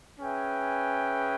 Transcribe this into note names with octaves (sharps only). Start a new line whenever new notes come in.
C#4 G#4 B4 E5 G5